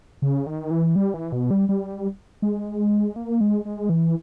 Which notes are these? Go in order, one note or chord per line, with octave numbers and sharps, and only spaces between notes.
C#3
D#3
E3
G3
E3
B2
G3
G3
G#3
A#3
G#3
G#3
E3